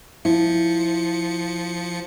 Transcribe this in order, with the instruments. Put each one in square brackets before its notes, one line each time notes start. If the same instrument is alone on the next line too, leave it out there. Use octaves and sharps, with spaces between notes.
[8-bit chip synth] F3 C#7 [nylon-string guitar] E4